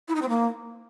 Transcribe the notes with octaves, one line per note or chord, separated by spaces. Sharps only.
E4
D#4
C4
A#3